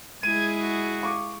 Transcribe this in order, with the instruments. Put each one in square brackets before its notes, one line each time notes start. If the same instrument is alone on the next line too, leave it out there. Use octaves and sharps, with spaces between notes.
[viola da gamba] G#3 E4 G#4 [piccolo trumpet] G#6 [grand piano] D#7
[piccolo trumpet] F#4
[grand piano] F5 C#6 D6